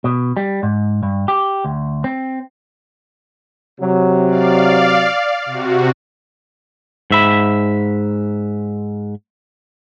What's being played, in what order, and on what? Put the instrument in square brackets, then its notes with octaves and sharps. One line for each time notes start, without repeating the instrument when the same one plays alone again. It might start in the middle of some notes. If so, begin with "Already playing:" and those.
[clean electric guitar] B2
G3
G#2
G2
G4
D2
C4
[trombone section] C3 F#3
[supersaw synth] D5 F5
C3 F#4
[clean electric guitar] G#2 E5 B5